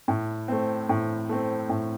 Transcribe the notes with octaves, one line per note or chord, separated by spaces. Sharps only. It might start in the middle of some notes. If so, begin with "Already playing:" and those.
A2
A3 C4
A2
A3 C4
A2